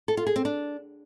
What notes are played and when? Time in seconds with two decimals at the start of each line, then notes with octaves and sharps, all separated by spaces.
0.08 A4
0.17 F4
0.27 G#4
0.36 C4
0.45 D4